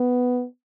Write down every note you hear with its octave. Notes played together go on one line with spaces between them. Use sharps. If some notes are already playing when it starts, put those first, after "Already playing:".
Already playing: B3